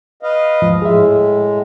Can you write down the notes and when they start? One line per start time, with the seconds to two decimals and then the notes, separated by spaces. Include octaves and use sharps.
0.23 B4 D#5 F5
0.62 D#2 G#2 F3
0.82 A2 G#3 G#4 E5